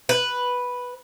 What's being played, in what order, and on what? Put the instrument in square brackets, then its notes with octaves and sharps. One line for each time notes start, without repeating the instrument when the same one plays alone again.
[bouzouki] B4